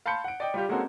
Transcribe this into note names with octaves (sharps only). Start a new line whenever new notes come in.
F5 A5 B5 C6 G6 C#7
F#5 D7
D5 D#5 G5
G3 F4 G4
G#3 A#3 C4 C#4 F#4 A4